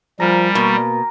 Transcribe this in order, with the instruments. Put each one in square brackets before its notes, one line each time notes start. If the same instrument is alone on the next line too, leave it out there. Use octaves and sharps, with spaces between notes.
[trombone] F3 [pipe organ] G3 [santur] A#4 G#5 A#5
[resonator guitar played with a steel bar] B2 [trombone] A#3